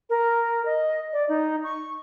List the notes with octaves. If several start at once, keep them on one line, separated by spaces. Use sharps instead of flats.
A#4
D#5
D5
D#4
C#6